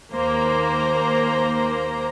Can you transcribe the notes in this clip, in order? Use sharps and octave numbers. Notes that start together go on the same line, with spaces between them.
D#2 A#3 C5 A#5